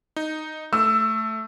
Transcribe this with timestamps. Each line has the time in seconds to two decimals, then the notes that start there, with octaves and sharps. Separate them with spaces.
0.16 D#4
0.73 A3 E6